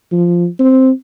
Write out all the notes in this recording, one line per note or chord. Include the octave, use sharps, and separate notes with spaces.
F3
C4